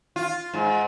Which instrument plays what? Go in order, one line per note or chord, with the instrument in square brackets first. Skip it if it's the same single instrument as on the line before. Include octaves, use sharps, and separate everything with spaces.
[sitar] F4
G#2